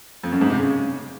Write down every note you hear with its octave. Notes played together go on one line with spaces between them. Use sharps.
F2
F#2
G#2
C3
C#3